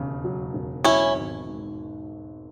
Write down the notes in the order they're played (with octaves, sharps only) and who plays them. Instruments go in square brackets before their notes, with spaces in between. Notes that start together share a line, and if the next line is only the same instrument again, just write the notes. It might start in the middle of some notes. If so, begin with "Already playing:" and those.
Already playing: [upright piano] E1 D#2 C#3
F#3
E1
[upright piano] F#3 [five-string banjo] C#4 E4
[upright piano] G#1
G#2